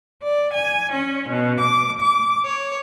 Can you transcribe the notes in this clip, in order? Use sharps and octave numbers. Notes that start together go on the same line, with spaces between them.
D5
G#5
C#4
B2
D6
D6
C#5